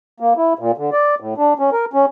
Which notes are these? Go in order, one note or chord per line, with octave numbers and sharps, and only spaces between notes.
A#3
E4
A#2
D3
D5
A2
D4
C#4
A#4
C#4